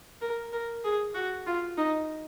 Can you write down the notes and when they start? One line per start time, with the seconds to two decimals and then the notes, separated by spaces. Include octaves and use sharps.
0.21 A#4
0.52 A#4
0.84 G#4
1.14 F#4
1.46 F4
1.77 D#4